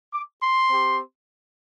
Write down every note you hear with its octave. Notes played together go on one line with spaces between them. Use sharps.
D6
C6
C4 G4